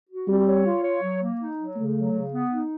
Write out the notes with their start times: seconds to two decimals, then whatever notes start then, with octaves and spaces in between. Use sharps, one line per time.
0.09 F#4
0.28 G3 C4
0.47 C#5
0.65 F4
0.83 C#5
1.02 F#3
1.21 A#3
1.39 D#4
1.58 F#3
1.76 C#3 A3
1.95 F#3
2.13 C#3
2.31 B3
2.50 D#4